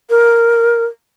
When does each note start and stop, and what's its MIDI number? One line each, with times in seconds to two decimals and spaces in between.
0.10 0.85 70